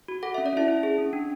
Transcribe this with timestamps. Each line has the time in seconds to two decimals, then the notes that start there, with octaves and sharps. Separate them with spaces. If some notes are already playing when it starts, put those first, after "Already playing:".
0.08 F#4
0.23 A4 F#5
0.34 C#4 E5
0.46 D5
0.53 C#4 E4 E5
0.68 E4
0.83 G#4
0.98 C#4
1.13 D4